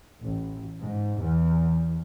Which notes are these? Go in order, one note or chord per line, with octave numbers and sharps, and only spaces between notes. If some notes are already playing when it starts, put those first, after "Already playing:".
A1
G#2
E2